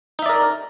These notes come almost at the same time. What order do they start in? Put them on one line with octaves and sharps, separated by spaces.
D#4 E5 D5 A#4